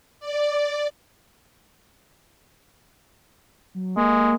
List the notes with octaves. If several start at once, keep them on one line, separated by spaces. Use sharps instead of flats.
D5
F#3
G#3 A#3